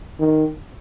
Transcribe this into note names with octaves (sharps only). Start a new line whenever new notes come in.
D#3